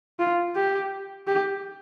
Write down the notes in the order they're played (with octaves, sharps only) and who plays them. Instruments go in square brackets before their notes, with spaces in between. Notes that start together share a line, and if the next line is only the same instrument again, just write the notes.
[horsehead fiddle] F4
G4
G4